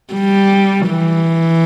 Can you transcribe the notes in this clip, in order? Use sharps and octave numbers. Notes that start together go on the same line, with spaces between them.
G3
E3